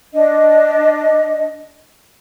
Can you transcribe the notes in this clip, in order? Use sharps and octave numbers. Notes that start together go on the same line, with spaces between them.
D4 D#5